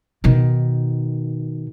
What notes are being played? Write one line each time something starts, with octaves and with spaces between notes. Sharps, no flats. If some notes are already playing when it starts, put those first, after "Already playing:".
B2 D#3